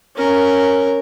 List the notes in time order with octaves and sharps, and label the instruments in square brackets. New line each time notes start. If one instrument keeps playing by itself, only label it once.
[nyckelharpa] C#4 A#4